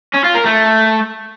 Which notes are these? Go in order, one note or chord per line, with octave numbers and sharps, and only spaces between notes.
C#4
F4
A#4
A3